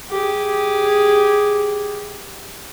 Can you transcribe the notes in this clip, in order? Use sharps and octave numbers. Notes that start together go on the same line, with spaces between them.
G4 G#4